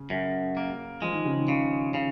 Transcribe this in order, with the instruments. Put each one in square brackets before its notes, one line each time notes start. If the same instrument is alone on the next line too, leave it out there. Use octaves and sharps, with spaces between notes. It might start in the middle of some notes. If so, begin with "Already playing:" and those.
Already playing: [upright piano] C#3
[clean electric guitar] F#2
A#3
[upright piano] F3 [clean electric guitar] G#3
[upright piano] D#3
C#3
D#3
[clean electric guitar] C#3
C#3